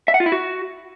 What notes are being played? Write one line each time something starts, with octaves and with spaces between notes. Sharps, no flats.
E5
F#5
F4
E4
F#4